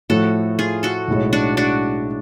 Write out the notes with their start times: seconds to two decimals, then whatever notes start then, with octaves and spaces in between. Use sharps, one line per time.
0.10 A2 F3 A3 F#4 A4
0.59 F4 G#4
0.83 F#4 A4
1.08 B1 A2 G#3
1.33 D4 F#4
1.57 D4 F#4